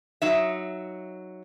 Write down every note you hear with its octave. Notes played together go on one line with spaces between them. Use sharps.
F#3 D#4 E5